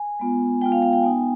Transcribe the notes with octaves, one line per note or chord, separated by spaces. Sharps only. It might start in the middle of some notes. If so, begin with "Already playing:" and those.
Already playing: G#5
G#3 B3 F4
G#3 B3 F4 G5
F5
F5
G5
B3 D#4 G#5